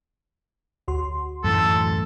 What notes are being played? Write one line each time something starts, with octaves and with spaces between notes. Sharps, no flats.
D2 F#4 C6
F#2 A2 E3 A4